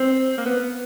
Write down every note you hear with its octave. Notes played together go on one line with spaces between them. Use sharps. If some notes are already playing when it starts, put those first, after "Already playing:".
Already playing: C4
A#3
B3